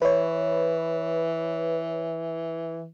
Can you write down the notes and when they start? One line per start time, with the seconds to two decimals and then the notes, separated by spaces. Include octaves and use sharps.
0.02 E3 B4 C#5